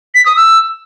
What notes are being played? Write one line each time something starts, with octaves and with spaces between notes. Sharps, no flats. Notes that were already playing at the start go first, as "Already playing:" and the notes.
B6
D#6
E6